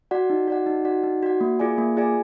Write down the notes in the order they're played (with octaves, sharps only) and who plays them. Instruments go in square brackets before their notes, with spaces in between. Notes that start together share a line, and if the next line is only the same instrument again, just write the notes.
[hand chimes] F#4 D5 F#5
D#4
F#4 D5 F#5
D#4
F#4 D5 F#5
D#4
F#4 D5 F#5
A#3
F4 G#4 D5 G#5
A#3
F4 G#4 D5 G#5